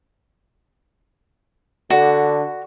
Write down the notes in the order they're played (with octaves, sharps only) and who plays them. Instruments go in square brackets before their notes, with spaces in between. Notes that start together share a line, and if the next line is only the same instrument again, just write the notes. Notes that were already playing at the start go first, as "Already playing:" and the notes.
[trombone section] D3 [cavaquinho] F#4